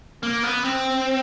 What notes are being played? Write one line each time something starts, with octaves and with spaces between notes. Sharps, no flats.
A#3
B3
C4